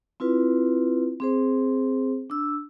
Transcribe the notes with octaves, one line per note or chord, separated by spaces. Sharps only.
C4 E4 F4 B4
C4 G#4 C5
D4 E6